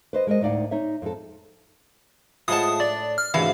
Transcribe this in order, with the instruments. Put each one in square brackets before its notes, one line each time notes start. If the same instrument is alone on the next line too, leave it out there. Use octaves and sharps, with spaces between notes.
[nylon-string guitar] B4 C5 D#5
G#3 A#4 C5 D#5
D2 A2 D#4 D5 F5 F#5
D#4 C#5 E5
F2 A4
[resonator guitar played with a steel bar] A2 A5 [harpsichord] F3 G#3 F#5 [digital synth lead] D#6
[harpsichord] D4 [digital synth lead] D5
[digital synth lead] F6
[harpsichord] D2 G#2 C3 [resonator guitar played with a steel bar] E3 [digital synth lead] F5